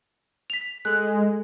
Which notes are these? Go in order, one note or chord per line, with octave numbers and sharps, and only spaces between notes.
B6 F7
G#3 A4 F#6